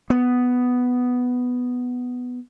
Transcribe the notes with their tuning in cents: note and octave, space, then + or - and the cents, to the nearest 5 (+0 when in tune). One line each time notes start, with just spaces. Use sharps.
B3 +5